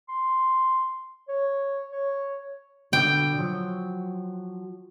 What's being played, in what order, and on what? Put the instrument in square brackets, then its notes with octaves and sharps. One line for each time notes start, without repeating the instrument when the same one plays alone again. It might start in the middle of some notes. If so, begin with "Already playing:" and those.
[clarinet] C6
C#5
C#5
[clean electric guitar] B2 D3 [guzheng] G5
[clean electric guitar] F3 F#3